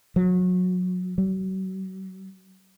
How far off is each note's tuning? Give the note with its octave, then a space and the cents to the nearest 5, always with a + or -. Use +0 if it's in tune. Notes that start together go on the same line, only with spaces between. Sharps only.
F#3 -25
F#3 +40